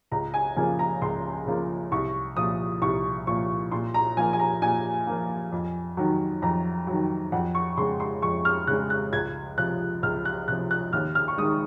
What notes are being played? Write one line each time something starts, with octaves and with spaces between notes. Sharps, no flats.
C#2 A#5
G#5
C#3 F3 A#3 G#5
A#5
C#2 C6
C#3 F3 A#3
C2 C#6
A#2 F3 D#6
C2 C#6
A#2 F3 C#6
A#2 C6
A#5
F3 A#3 G#5
G#5
A#5
A#2 G#5
F3 A#3
F2
D#3 F#3
F2 A#5
D#3 F#3
F2 F#5
C#6
C#3 G#3 C6
C6
F2 C#6
F6
C#3 G#3 F#6
F#6
C#2 G#6
C3 F3 F#6
C#2 F6
F#6
C3 F3 F#6
F#6
D#2 F6
F6
C#6
D#3 G#3 D#6